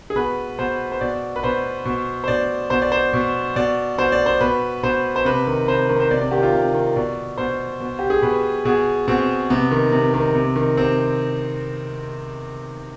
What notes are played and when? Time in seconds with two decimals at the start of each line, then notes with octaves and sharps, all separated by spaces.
0.10 G#4
0.15 B2 B4
0.59 B2 C5
0.92 C5
1.01 B2 D5
1.36 B4
1.43 B2 C5
1.85 B2
2.24 C5
2.28 B2 D5
2.70 B2 C5
2.82 D5
2.92 C5
3.13 B2
3.56 B2 D5
3.98 B2 C5
4.12 D5
4.26 C5
4.40 B2 B4
4.83 B2 C5
5.16 C5
5.25 C3 B4
5.47 D#3
5.68 C3 C5
5.89 D#3
6.00 C5
6.11 C3 D5
6.21 D5
6.31 D#3 G4
6.43 F4
6.53 C3
6.74 D#3
6.96 B2 D5
7.38 B2 C5
7.80 B2
7.99 G4
8.10 G#4
8.22 B2 B4
8.65 B2 G#4
9.08 B2 C4
9.50 C3 B3
9.71 D#3
9.92 C3
10.14 D#3
10.35 C3
10.56 D#3
10.77 C3 C4